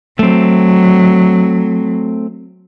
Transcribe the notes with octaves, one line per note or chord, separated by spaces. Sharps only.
F#3 A3 C4